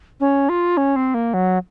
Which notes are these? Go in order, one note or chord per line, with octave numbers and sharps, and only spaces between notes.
C#4
F4
C#4
C4
A#3
F#3